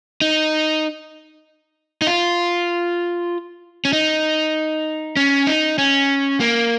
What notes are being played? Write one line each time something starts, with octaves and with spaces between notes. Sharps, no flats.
D#4
D#4
F4
C#4
D#4
C#4
D#4
C#4
A#3